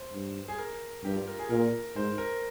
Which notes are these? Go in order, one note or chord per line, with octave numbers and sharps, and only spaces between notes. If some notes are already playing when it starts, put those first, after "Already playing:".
Already playing: C5
G2
G#4
A#4
G2 G4
F4
A#4
G#4
A#2 A#4
G#2 C5
A#4